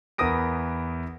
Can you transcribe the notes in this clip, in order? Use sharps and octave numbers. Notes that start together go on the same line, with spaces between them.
E2 B3 A#4 D#6 A#6 D7